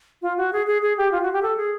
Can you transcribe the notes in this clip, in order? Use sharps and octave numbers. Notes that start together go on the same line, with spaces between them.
F4
F#4
G#4
G#4
G#4
G4
F4
F#4
G4
A4
G#4